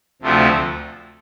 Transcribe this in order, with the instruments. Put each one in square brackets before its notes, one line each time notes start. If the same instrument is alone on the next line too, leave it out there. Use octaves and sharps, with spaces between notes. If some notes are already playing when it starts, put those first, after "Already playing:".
[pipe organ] D2 C3 F3 A3